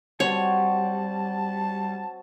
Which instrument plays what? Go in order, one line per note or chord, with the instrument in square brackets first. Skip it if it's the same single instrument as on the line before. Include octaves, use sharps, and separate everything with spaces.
[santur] F#3 C4 G5 [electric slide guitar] G3 [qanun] C#5 [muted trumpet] A5